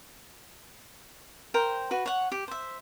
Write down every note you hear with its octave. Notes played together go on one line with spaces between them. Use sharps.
A#4 C5 G5
F#4 B4
C#5 F#5
G4
C5 E5